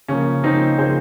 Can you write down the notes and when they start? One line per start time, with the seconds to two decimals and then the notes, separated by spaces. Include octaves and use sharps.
0.08 C#3 F3 A#3 C#4
0.43 C#3 F3 A#3 C4 D#4
0.78 C#3 F3 A#3 G#4 C5